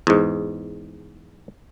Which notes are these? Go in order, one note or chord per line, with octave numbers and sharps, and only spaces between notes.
E2 G#2